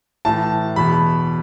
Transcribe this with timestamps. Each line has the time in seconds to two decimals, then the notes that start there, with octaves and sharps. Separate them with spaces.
0.25 A2 E3 A5
0.76 E2 B2 B5